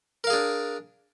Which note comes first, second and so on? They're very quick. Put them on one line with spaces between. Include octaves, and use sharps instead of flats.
A#4 F5 G#4 D4